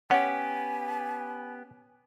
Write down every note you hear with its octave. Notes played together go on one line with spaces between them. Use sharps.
B3 C#4 G4 F#5 G#5